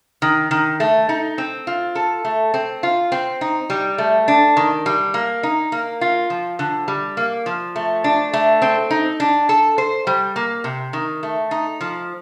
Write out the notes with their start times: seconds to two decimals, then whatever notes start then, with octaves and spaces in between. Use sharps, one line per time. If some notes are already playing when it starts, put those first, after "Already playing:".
0.22 D#3
0.51 D#3
0.80 A3
1.09 D#4
1.38 C4
1.67 F4
1.95 A4
2.25 A3
2.54 C4
2.83 F4
3.12 C4
3.41 D#4
3.70 G3
3.98 A3
4.28 D4
4.57 D#3
4.86 G3
5.14 A#3
5.43 D#4
5.72 A#3
6.01 F4
6.30 F3
6.59 D3
6.88 G3
7.17 A#3
7.46 F3
7.76 A3
8.04 D4
8.33 A3
8.62 C4
8.90 D#4
9.20 D4
9.49 A4
9.78 C5
10.07 G3
10.36 A#3
10.64 C3
10.93 D#3
11.23 A3
11.51 D#4
11.81 F3